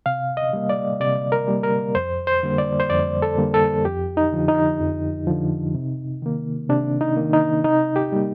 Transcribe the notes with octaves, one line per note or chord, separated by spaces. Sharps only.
C3 F5
D#5
G3 A#3
D5
C3 D5
A#4
G3 A#3
A#4
F2 C5
C5
D3 G3 A#3
D5
C5
F2 D5
A4
D3 G3 A#3
A4
F2 G4
D#4
D3 F3
D#4
F2
D3 F3
C3
D#3 A#3
C3 D4
D#4
D#3 A#3
D#4
C3 D#4
G4
G3 A#3